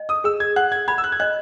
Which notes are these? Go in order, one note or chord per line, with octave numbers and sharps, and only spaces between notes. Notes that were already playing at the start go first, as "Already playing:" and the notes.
Already playing: D#5
D#6
G#4 E6
G#6
F#5 F#6
G#6
B5 G#6
E6
F#6
G#6
D#5 F#6